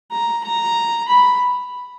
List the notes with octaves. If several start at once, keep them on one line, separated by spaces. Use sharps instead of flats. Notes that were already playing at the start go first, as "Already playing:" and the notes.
A#5
A#5
B5